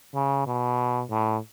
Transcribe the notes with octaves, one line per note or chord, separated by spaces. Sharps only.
C#3
B2
A2